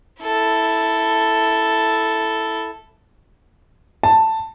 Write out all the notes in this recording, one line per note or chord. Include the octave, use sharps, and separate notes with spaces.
E4 A4
A5